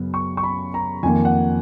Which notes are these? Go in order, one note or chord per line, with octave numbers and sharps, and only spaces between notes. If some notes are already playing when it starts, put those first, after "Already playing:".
Already playing: F#2 C#3 B3
C#6
C#6
B5
A#5
F2 D#3 A#3 G#5
F#5